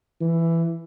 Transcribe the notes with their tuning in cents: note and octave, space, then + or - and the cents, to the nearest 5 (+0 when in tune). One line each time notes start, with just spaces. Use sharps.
E3 +10